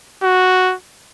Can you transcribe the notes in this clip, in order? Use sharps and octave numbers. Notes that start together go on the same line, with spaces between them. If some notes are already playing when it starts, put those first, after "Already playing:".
F#4